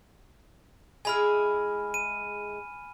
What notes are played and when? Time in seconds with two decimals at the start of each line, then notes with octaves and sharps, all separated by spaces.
1.05 G#3 E4 G#4 G#5 B5 F6
1.94 D#7